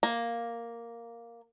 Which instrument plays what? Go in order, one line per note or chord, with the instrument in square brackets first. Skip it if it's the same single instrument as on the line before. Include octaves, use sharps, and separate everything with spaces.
[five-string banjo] A#3